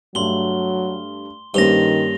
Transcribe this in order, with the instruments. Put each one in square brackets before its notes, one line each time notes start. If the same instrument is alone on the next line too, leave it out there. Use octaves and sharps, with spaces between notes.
[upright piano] G2 A3 [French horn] F#3 [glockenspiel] C6 G7
[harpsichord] G2 [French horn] D#3 [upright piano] A#3 C#4 C5 [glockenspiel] A#6 F7 G7